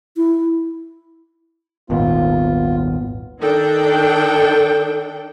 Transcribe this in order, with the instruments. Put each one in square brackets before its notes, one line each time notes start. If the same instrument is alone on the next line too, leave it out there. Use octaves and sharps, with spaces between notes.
[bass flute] E4
[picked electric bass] D#1 G#1 D#2 [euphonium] B3 [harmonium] F4
[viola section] D#3 D4 A4 G5